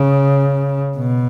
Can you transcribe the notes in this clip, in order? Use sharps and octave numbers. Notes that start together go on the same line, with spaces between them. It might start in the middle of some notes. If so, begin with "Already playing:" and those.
Already playing: C#3
B2